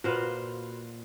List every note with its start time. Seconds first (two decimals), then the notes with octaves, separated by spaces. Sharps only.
0.04 A#2 F#4 B4 C5 F5